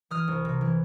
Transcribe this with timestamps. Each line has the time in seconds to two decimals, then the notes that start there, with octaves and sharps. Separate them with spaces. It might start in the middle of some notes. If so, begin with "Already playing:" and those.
0.10 E3 D#6 F6
0.28 C2
0.45 C3
0.61 E3